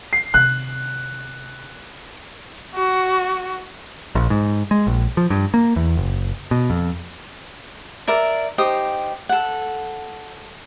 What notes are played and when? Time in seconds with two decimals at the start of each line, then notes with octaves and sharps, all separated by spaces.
0.13 C7
0.34 C3 D#3 F#6
2.75 F#4
4.15 A#1
4.30 G#2
4.71 G#3
4.87 A#1
5.17 F3
5.30 G2
5.54 A#3
5.76 E2
5.97 F#1
6.51 B2
6.70 F2
8.07 A#4 D5 E5
8.58 D#4 G4 C5 D#6
9.29 A4 F#5